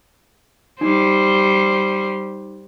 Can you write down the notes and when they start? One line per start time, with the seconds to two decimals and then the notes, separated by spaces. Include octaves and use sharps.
0.81 G3 D#4 C5